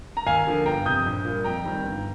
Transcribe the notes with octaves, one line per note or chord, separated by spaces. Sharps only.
A#5
D#2 F5 G#5
D3 F3 A#3
G1 G5 A#5
F2 C3 D#6 G6
A#1
A#2 G3 A#3
F2 G5 A#5
D#3 G3 C4
G1